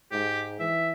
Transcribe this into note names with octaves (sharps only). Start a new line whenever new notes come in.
G#2 G4
E3 E5